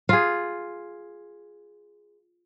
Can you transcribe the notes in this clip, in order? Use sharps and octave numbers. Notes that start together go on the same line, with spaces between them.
F4 G#4